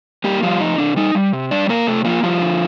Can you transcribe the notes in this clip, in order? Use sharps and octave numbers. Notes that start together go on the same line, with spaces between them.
G3 A#3 G4
F3 G3 F4
F2 D#4
C3 D4
G3 D#4
G3
C3
G3 D4 D5
C3 A#3 A#4
C3 A3 A4
F3 A#3 F4
F3 G3 F4
D3